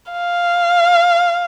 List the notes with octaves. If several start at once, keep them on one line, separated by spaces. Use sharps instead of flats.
F5